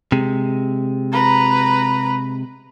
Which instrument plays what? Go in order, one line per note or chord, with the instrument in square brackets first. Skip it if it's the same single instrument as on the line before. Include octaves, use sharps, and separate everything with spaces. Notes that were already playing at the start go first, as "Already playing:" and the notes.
[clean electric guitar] C3 G#3
[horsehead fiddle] B4 A#5